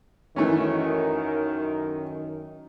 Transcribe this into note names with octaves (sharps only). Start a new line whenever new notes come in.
F#2 D#3 E3 A3 C#4